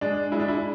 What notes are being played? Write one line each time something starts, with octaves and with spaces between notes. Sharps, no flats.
G#3 D4
G#3 E4
D4
E4